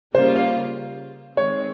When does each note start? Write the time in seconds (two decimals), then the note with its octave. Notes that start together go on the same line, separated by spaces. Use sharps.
0.15 C#3 G3 A#3 F4 C5
0.36 F5
1.37 D#3 G#3 C4 C#5